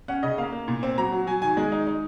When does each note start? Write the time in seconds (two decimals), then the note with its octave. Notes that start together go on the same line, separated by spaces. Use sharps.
0.08 C#4 F#5
0.23 C#3 D#5
0.38 A#3 F5
0.52 A#3
0.68 A#2
0.83 C4
0.98 F#3 A#5
1.12 F#3
1.27 F#3 G#5
1.42 D#3 G#5
1.57 G#3 G#5
1.72 D#4
1.87 D#4